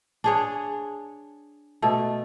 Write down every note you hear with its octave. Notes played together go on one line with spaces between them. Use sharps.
D4 G#4 C#5
B2 A3